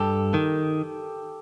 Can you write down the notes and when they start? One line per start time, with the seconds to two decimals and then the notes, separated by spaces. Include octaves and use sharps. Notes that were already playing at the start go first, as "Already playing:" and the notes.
Already playing: G2 G4 A4
0.34 D#3